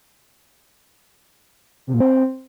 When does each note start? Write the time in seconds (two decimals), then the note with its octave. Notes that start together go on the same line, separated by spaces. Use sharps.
1.87 C3
1.94 A#2
2.00 C4